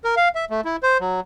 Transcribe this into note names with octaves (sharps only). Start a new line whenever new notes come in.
A#4
F5
E5
A3
E4
C5
F#3